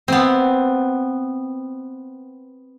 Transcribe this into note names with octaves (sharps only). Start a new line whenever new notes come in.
B3 C4